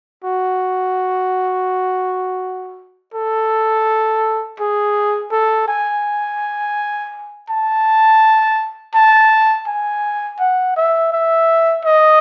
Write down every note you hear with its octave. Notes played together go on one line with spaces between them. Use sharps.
F#4
A4
G#4
A4
G#5
A5
A5
G#5
F#5
E5
E5
D#5